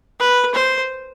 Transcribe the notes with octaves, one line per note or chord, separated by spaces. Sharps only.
B4
C5